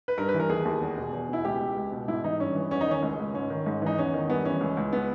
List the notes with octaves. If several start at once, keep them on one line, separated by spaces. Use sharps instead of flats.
B4
G2 A#4
B4
E3
A#4
D#2 G#4
D#2
E2
B2
E2
B2 E4
C#2 G4
C#2
C#2
B2
G#2 E4
E3 D#4
G2 C#4
E3
E2 C#4
D#4
D#3 C#4
C#2
C#2
G#2 C#4
D#3
G#2
E3 D#4
E2 C#4
D#3
G2 B3
E3 C#4
C#2
C#2
B3